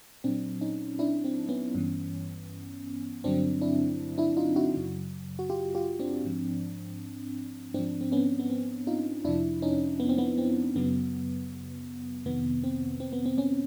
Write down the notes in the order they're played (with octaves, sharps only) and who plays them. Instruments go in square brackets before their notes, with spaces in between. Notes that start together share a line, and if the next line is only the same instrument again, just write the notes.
[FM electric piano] A#2 F#3 C4 D4
C#4 D#4
D4 E4
C4
B3 C#4
G2 E3
G2 D3 F#3 C4 D4
D4 E4
D4 E4
D#4 F4
E4 F#4
F#2 C#3 F#3
F#4
F4 G4
F4 G4
C4 D4
G#2 F3
G#2 F3 C4 D4
C4
B3 C#4
B3
C4
D#4 F4
F2 C3 F3 D4 E4
C#4 D#4
B3
C4
B3
C4
F#2 C#3 F#3 B3
F2 C3 D#3 B3
C4
C4
B3
C4
B3 C#4